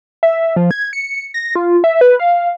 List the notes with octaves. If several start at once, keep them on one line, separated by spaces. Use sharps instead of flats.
E5
F3
G#6
C#7
A#6
F4
E5
B4
F5